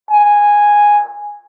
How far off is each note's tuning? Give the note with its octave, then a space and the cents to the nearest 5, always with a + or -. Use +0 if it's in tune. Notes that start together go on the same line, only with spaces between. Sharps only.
G#5 -5